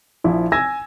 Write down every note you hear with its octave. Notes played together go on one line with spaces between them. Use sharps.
A#1 F3 E4
G#5 E6 G#6 A#6